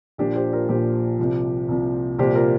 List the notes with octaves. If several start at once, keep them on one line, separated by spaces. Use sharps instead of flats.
A#1 A#2 F3 D4 G4
G4 C5
F4 A#4
A#1 A#2 F3 G4 C5
C2 C3 F3
C2 C3 F3
C2 A#2 F3 G4 C5
F4 A#4